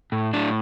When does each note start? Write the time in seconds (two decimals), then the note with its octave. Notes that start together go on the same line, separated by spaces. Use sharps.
0.12 A2
0.34 A2 D4